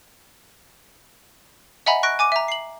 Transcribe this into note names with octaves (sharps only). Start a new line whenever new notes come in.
D#5 E5 F#5 G#5 A#5 B5
C#6 F#6 A#6 D7
G#5 D6 D#7
E5 A#5
C7 F#7